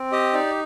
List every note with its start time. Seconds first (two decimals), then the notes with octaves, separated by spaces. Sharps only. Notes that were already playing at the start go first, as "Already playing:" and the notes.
Already playing: C4
0.12 G4 D#5
0.34 D#4 D5